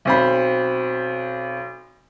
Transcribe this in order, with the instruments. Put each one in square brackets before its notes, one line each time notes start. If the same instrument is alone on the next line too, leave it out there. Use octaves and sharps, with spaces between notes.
[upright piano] B1 C4 B5